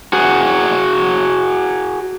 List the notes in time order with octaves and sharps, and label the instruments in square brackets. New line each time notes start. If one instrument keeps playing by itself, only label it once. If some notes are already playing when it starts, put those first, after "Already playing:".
[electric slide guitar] F#4 G#4